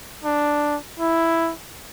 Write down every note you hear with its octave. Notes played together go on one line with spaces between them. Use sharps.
D4
E4